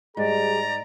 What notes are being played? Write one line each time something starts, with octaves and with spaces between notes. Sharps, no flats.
G#2 G3 G#4 D5 A#5